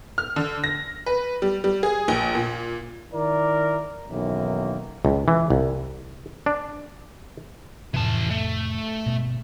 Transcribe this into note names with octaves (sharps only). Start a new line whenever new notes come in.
F6
D3
A#6
B4
G3
G3
G#4
A#1
A#2
D#3 E4 A#4 D5
B1 F#2 D#3 E3 A#3
C#2
E3
C2
D4
F2 A2 C3 E3 A5
A3
G1 B2